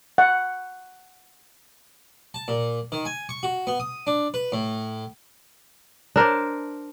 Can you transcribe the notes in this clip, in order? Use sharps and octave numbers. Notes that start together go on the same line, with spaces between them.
F#5
A5
A#2
D#3
G#5
C#6
F#4
B3
D#6
D4
B4
A2
D4 A#4 C5 D5